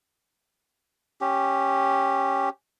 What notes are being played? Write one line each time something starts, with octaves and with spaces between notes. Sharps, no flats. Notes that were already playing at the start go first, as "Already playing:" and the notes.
C#4 G4